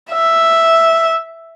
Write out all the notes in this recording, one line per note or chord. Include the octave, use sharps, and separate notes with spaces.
E5